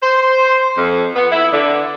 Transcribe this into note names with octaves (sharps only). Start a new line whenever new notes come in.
C5
F2
B3
E4
D3